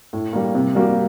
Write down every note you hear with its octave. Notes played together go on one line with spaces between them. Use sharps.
A2
G3 A#3
C3
G3 A#3 F#4